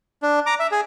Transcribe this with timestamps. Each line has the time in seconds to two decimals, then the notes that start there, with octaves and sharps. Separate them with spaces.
0.23 D4
0.46 A#5 D6
0.60 E5
0.71 G#4